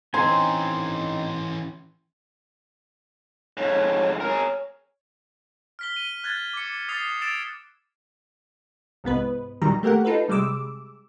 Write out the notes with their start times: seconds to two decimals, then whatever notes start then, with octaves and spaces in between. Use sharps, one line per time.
0.14 E3 C4 C#4 D#4 G#5 C6
3.57 F2 G#2 C#5
4.21 G#4 A#4 C#5
5.79 F6 B6 G7
5.96 D#7
6.24 F#6 G#6 A6
6.53 D6 C#7
6.89 D#6 A6 C7 F7
7.22 E6 A6 D7 E7 F7
9.04 C2 G#2 B3 B4
9.62 A#2 D#3 F#3 G3 A#5
9.83 A3 A#3 G4 A#4 F#5
10.05 D#4 F4 A4 B4
10.28 C3 G3 G#3 D6 E6